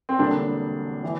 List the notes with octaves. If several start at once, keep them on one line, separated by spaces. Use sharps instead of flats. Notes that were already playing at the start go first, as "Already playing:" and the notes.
C4
E1 E2 D3 G3 A#3 D4
E3